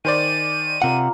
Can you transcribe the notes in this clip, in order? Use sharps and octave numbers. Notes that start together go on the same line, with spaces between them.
D#3 C5 D5 G#5 D#7
C3 F4 A#4 D5 F#5